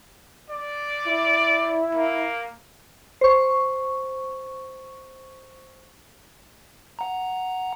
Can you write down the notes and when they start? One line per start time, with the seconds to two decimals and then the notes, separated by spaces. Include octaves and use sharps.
0.50 D5
1.07 E4
1.95 A#3
3.21 C5 C#6
6.99 F#5 A#5